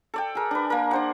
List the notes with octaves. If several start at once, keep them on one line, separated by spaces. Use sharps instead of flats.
A4 D5 G5
G#4 A#4
D4 B4
A#3 A#4
D4 C5 F#5